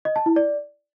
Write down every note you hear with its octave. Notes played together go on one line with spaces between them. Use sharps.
D#5
A5
E4
D5